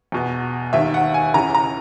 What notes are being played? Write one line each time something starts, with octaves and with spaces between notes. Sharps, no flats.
E2 B2
D#2 D#3 E5
F#5
G#5
C#2 C#3 E3 A#5
A#5